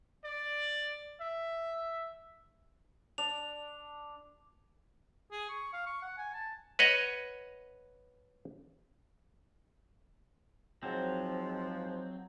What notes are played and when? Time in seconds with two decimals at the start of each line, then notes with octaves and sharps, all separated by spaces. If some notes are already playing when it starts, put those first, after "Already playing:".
0.24 D5
1.20 E5
3.18 D4 F7
5.31 G#4
5.49 C#6
5.74 F5
5.87 C#6
6.02 F#5
6.18 G#5
6.34 A5
6.79 B4 C#5 D#5 F#5
10.83 G#2 F3 F#3 C4